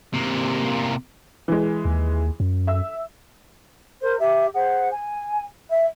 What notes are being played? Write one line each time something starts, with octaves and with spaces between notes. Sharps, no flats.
C3 A#3
E3 G#3
D#2
F#2
E5 E6
A#4 C5
G4 E5
G#4 C5 F#5
G#5
E5